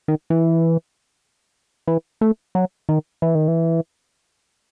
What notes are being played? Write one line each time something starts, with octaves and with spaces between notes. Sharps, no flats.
D#3
E3
E3
A3
F#3
D#3
E3
D#3
E3